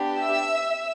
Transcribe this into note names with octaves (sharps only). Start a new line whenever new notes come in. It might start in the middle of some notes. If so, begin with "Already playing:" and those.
Already playing: B3 D4 G4
E5 E6